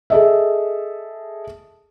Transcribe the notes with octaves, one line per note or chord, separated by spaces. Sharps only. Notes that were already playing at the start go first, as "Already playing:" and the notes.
G#4 A4 D#5 E5